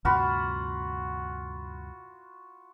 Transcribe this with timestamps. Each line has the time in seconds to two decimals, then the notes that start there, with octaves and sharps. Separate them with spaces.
0.05 D2 G2 C3 F4 F#4 B5